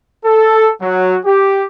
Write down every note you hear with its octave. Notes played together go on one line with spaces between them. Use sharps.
A4
F#3
G4